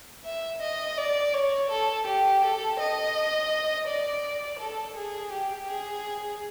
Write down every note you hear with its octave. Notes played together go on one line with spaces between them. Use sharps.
E5
D#5
D5
C#5
A4
G4
A4
D#5
D5
A4
G#4
G4
G#4